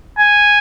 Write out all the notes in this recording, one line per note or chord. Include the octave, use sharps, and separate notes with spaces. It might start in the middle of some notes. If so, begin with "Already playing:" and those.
G#5